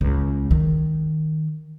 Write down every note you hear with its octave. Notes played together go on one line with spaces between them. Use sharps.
C#2
D#3